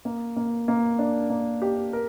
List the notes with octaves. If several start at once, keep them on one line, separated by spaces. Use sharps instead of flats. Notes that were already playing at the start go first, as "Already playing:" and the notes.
A#3
A#3
A#3
D4
A#3
G4
A#4